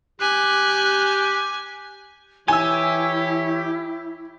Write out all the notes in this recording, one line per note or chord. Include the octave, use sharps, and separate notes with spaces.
G4 G#5 F#6
E3 E4 G4 C#5 G#5 E6